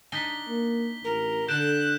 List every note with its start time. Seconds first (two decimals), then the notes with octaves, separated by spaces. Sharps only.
0.12 D4 D#4 B6 G7
0.48 A#3
1.04 A1 A#4
1.48 D3 D4 F#6 G6 D7 E7